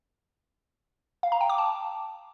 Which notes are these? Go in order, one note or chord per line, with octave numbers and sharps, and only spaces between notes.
F5
A#5
G5
D6
A5